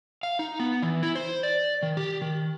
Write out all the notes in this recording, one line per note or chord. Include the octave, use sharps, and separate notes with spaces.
F5
D#4
B3
E3
E4
C5
D5
D#3
G4
D#3